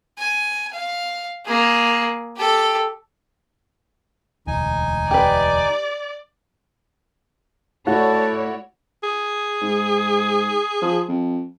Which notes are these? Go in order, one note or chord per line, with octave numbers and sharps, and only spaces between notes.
G#5
F5
A#3 G#4
G4 A4
E1 D2 D#4 G#5
G4 B4 D5
A3 E4 F#4 C#5 D5 A5
G#4
G#2
F3
F2